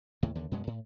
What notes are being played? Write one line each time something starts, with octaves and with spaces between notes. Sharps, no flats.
D#2 A2 C#3
D#2 D3
F#2 B2 G#3 B3
A2